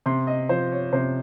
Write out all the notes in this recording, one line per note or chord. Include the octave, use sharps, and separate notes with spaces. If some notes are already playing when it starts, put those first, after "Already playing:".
C3 C6
D#5
F3 C5
C#5
C3 C5